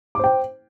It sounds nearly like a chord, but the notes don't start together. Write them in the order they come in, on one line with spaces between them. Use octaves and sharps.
D6 C5 G5